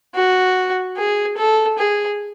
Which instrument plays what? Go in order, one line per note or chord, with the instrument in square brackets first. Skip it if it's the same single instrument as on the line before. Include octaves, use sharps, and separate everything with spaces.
[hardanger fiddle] F#4
G#4
A4
G#4